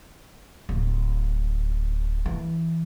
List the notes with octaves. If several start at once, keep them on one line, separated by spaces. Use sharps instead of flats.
D1
E3